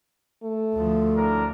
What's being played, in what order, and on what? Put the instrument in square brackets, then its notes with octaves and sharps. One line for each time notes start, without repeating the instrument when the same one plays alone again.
[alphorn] A3
[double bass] D2 F3
[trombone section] A2 D4 A#4